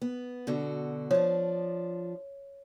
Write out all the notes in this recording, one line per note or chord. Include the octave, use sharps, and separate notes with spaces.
B3
B2 D3 F#4
F3 D4 C#5